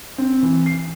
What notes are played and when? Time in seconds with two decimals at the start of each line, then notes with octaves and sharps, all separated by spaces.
0.18 C4
0.43 E3
0.66 C7